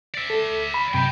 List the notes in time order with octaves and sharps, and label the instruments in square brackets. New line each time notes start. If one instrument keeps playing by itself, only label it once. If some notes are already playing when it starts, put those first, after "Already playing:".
[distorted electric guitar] D5 E5
[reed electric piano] A4
B5
[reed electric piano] F#2 C3 B5 [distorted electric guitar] D#5 G5